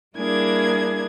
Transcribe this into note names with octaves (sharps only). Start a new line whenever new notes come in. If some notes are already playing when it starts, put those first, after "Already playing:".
G3 A#3 D4 E4 G#4 G#6